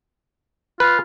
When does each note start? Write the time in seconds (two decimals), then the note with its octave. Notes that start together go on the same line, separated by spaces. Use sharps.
0.80 F4 B4